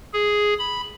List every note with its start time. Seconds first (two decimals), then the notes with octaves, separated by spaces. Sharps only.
0.14 G#4
0.59 B5